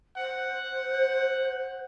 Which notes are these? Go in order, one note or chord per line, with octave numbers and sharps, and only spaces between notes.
C5 F#5